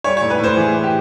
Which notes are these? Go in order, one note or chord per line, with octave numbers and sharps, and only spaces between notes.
G3 C#5
C#5
A2
B4
A2 C5
E3 G#4
E3
G4